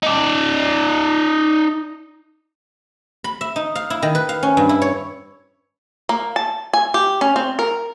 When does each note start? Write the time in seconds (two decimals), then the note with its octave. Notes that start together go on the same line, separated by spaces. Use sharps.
0.03 D#4 D5
3.24 B5
3.41 E5
3.56 D#4
3.76 F5
3.90 E4
4.03 D#3
4.15 B4
4.29 F5
4.43 C#4
4.57 G2
4.69 E4
4.82 C#5
6.09 A#3
6.36 A5
6.73 G#5
6.94 G4
7.21 C#4
7.36 C4
7.59 A#4